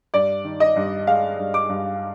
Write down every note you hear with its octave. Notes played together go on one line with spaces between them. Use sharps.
G2 D5
D#3
D#5
G2
G#3 F5
G2
D6
G2